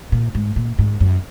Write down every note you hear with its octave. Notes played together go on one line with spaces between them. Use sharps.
A#2
G#2
A#2
G#2
F#2